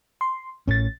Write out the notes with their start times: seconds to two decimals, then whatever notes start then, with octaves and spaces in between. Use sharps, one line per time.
0.21 C6
0.68 A1 A2 C#4 A6